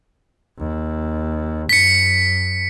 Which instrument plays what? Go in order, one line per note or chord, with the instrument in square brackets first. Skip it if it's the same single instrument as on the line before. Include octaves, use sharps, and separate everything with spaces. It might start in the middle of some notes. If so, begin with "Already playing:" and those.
[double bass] D#2
[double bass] F#2 [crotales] B6 C#7